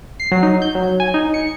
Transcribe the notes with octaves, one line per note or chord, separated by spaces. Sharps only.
C7
F#3
D#4
G6
F#3
G#5
D#4
C#7